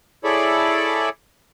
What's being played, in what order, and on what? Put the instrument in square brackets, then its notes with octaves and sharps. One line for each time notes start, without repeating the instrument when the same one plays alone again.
[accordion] E4 G#4 A4 C#5 D5 B5